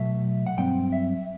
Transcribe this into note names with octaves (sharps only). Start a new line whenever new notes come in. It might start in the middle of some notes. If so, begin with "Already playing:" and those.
Already playing: B2 F#3 A3 E5
F#5
G2 F#3 C4 G5
E5